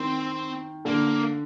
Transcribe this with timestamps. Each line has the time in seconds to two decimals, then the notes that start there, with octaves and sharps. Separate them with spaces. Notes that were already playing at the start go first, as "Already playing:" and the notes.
Already playing: D#3 C4
0.85 D3 A#3